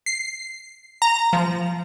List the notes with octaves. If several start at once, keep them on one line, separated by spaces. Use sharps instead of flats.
C7
A#5
F3